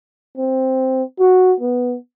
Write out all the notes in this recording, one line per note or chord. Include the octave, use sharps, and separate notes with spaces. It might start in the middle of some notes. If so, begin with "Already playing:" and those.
C4
F#4
B3